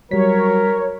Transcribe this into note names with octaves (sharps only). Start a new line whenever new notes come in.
F#3 G3 A#4 C#5 B6